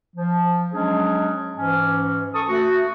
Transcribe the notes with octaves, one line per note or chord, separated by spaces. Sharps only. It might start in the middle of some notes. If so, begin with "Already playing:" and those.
F3
F#3 G#3 C#4 D4 G#4
G#2 E3 C#4
A4 A5 C#6 D#6
A3 F#4